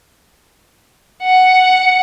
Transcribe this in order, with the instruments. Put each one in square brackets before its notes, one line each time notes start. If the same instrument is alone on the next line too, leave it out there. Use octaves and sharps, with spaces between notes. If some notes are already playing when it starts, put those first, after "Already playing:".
[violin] F#5